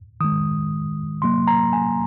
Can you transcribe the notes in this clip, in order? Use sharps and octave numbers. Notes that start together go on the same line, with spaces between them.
D#3 G#3 D#6
C3 F#3 A#3 C6
A#5
G#5